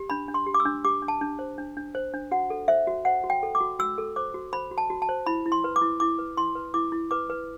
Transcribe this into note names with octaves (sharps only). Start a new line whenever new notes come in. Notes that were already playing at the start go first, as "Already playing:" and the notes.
Already playing: G4
D4 B5
D4
C6
G4
D6
E6
D4
G4 D6
D4
A5
D4
C5
D4
D4
C5
D4
F#4 F#5
A4
C5 E5
F#4
C5 F#5
F#4
G5
A4
D6
F#4
F#4 E6
A4
C5 D6
F#4
C5 B5
F#4
A5
F#4
A5
C5
E4 B5
E4
C6
B4
D6
E4
E4 D6
B4
E4 C6
B4
E4 D6
E4
B4 D6
B4